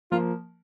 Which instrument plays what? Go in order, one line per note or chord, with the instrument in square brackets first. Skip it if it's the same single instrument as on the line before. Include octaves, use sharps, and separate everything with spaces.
[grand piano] F3 A#3 [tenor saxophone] F4